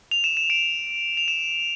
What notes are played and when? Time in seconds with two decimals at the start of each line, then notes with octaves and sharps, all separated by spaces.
0.11 F7
0.24 E7
0.37 E7
0.50 D7
1.17 F7
1.28 E7